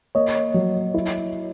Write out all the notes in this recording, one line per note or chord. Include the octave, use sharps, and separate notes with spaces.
A#3 C#5 D#5
F#3
E4